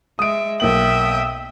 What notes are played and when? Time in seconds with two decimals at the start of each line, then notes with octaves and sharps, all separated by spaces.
0.19 G#3 E5 D#6 D7
0.60 B1 A#3 E5 G5 D#6 F#7